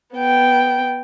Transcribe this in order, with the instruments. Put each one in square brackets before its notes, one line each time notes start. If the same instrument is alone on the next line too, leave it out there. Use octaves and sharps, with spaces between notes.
[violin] B3 G5